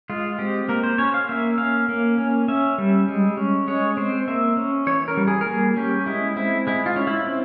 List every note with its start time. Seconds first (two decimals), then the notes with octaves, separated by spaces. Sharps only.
0.10 G#3 F4
0.39 C4 G4
0.69 A#3 A#4
0.83 C5
0.98 C#4 C#5
1.14 F5
1.29 A#3 E5
1.58 C#4 F5
1.89 A#3
2.18 C#4
2.48 C#4 E5
2.78 G3
3.09 G#3
3.37 C#4
3.68 G#3 C#5
3.97 C4 C5
4.28 A#3 E5
4.57 C#4
4.87 E3 C#5
5.08 A#4
5.17 G3
5.28 G#4
5.41 A#4
5.46 A#3 G#4
5.76 C#4 G4
6.06 G#3 E4
6.36 C4 E4
6.67 G#3 E4
6.86 F4
6.96 C#4
7.07 E4
7.27 C4